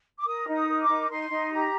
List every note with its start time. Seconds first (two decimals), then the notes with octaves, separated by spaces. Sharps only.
0.19 D6
0.26 A#4 D#6
0.47 D#4
0.54 D#6
0.68 A#4
0.82 D6
0.88 D#4
1.10 D#4 C6
1.30 D#4
1.51 G4 A#5